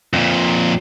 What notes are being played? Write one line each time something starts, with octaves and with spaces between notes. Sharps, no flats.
F2 A#2